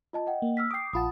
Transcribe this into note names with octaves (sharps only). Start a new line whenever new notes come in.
F4 D#5 A5
D#5 F#5 G5
A#3
E6 F6 B6
G5 D6 D#6 C7
A#1 F4 F#5 A5 B5 D#6